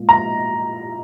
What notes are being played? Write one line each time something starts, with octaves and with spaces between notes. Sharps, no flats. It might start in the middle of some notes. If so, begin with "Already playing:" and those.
Already playing: A#2 G#3
A#5